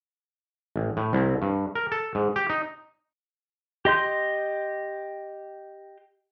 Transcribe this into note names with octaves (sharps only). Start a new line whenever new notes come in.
A1
A2
C2
G2
A#4
A4
G#2
G4
D#4
G4 D#5 C6 G6